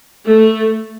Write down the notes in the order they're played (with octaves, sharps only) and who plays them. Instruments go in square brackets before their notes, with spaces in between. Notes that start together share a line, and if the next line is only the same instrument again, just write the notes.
[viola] A3